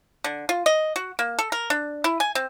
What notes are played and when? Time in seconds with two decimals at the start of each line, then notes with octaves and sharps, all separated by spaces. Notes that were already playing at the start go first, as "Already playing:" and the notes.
0.24 D3
0.49 F4
0.66 D#5
0.96 F#4
1.19 A#3
1.39 A4
1.52 A#4
1.70 D4
2.04 E4
2.20 G#5
2.35 C4